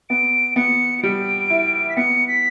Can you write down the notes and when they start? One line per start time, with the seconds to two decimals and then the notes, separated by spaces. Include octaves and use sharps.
0.10 B3 D7
0.56 B3 C#7
0.98 C#7
1.03 G3 D7
1.50 E4
1.90 B6
1.97 B3 C#7
2.28 B6